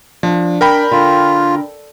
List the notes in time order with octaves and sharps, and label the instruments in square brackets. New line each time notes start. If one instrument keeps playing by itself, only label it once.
[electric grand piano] F3 [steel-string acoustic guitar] D4
[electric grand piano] A#4 G5 B5
[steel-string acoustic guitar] D3 [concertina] F4